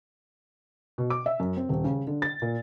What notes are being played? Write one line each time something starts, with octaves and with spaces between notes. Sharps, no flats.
B2
D6
E5
F#2
C4
D#1
C#3
D3
A6
A#2